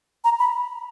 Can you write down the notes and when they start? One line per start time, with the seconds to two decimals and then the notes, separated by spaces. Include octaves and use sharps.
0.24 A#5
0.39 B5